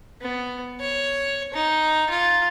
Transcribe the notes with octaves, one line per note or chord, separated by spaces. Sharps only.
B3
C#5
D#4
F4